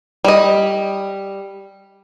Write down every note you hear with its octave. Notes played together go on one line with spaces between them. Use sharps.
G3 D#5